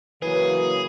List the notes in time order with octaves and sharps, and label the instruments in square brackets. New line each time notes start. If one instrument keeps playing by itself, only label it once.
[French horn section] C#3 F#3 A#3 [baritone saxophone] E3 [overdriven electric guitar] G#4 [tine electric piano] B4